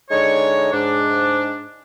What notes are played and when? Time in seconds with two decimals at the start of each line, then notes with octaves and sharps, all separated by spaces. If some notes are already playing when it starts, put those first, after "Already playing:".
0.11 D3 G#3 D#4 C#5
0.73 G#2 D4